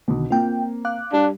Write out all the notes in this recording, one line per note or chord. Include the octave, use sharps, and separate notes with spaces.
B1 B2 D3 D#3
A#3 C4 F4 G5
F5 D6 F#6
G3 D4